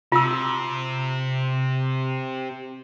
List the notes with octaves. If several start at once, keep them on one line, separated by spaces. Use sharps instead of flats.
C3 F4 E6